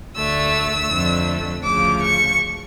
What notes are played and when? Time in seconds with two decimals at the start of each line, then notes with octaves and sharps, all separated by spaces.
0.16 D2 D3 A3 E6
0.90 F2 D3 A3
1.64 D2 C#3 F3 D6
2.02 C#6